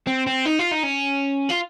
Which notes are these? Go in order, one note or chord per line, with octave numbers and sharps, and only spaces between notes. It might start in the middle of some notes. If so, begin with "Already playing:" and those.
C4
C4
D#4
F4
D#4
C#4
F4